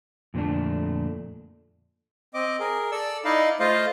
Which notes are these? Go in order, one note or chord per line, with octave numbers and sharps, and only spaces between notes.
F2 A#2 D3 A3 D4
C4 D#5 D6
G#4 A#4
A4 D5 E6
D#4 E4 D5 D#5 F5
A3 F4 C5 D#5 F5